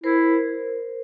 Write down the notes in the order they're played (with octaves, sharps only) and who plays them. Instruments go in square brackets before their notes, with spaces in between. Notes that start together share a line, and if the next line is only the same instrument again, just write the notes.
[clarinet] E4 [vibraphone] A#4 C5